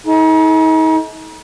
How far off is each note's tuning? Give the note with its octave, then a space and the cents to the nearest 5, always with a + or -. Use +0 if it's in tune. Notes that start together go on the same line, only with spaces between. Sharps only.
D#4 +40 A4 -40